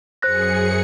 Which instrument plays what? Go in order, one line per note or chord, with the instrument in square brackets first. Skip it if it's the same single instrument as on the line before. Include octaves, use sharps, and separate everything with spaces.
[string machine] F#2 G#4 C#7 [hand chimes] C5 F#6 A#6